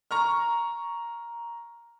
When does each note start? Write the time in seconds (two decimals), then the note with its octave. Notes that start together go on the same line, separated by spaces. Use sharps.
0.11 A#5 C#6 F6